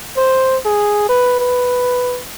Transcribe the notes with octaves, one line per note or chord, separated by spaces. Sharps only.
C5
G#4
B4
B4